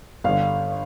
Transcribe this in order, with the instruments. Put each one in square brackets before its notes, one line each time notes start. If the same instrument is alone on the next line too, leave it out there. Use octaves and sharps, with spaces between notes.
[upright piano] G1 G2 D3 [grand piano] F5